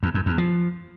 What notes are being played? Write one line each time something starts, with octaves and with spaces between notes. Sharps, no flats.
E2
F#2
E2
F3